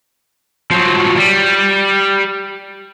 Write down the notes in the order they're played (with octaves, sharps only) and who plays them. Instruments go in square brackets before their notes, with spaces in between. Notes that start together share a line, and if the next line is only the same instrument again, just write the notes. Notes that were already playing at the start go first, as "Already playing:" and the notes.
[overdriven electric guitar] F3 F#3
G3